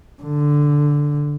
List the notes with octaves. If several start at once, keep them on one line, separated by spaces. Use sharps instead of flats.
D3